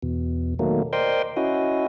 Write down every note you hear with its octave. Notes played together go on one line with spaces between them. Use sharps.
E2 B2
B2 D#3 F#3 A3 A#3
A#4 C5 D5 D#5 G5 C6
C#4 E4 F#4 D#5